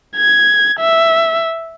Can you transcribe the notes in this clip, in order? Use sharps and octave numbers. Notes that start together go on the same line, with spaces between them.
G#6
E5